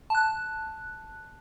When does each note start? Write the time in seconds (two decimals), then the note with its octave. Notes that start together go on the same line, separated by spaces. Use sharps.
0.10 A5 F#6